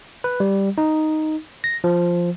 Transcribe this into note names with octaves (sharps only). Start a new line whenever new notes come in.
B4
G3
D#4
A#6
F3